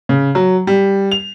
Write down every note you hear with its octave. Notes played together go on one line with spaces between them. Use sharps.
C#3
F#3
G3
F7